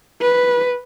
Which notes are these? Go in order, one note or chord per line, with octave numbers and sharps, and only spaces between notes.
B4